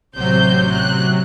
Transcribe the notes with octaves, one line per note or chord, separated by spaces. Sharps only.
A1 C3 F#3 C5 G6
F#6